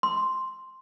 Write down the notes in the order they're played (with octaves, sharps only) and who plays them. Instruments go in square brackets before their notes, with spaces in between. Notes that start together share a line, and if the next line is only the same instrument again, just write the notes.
[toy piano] C6